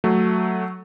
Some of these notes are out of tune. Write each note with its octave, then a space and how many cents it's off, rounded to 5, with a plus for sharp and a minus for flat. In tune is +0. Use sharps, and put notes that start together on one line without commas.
F#3 +0 A3 +0